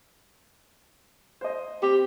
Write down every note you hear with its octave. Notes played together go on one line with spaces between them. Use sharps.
C5 D#5
C4 G4